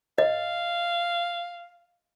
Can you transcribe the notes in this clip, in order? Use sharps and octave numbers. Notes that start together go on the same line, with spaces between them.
D#5 F5